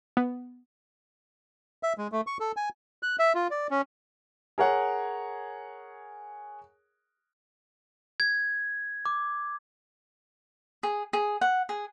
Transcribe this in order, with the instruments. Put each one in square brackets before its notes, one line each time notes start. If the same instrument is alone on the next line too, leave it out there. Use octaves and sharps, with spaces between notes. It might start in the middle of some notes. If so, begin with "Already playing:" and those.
[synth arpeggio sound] B3
[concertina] E5
G#3
A3
C#6
A4
G#5
[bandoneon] F#6
E5
F4
D5
C#4
[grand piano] G#4 A#4 C#5 F#5
[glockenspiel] G#6
D6
[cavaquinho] G#4
G#4
F#5
G#4